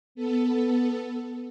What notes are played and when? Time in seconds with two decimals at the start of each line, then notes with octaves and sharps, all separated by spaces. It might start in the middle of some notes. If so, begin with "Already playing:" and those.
0.15 B3 A4